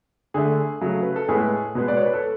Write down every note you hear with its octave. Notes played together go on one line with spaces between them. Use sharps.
D3 A3 G#4
C#3 F#3 A3
B4
A4
A2 G#3 B3 G#4
B2 G#3 B3
D5
C#5
B4
A4